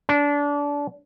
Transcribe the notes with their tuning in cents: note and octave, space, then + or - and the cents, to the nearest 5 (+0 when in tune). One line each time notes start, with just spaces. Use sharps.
D4 -25